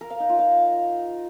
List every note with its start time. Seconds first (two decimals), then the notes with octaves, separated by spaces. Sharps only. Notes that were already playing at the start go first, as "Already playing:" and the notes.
0.01 A#4
0.10 F5
0.20 D#4
0.29 F4
0.39 F5